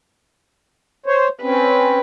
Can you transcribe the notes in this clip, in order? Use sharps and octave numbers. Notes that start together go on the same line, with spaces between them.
C5 C#5
C4 C#4 B4